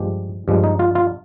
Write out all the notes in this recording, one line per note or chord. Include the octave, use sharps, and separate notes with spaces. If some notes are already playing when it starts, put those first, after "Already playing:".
Already playing: G2 F3 G#3 G4
G2 F3 G#3
D#4
F4
F4